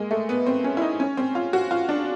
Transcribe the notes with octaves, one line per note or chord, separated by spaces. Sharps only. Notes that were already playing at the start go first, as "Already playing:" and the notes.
Already playing: G#3 A#3
A3
B3
C4
C#4
E4
D#4
C#4
C4
F4
F#4
F4
D4